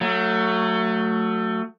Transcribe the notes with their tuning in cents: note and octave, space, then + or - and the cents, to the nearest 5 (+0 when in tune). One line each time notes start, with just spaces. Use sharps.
F#3 +0 A3 +25